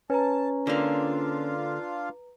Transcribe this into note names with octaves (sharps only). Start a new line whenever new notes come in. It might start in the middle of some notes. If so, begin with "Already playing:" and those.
C#4 B4 A5 A#5
D3 A#3 D4 F4 F5